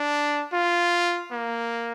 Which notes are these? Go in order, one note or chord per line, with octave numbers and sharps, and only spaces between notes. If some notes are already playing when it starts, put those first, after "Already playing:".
Already playing: D4
F4
A#3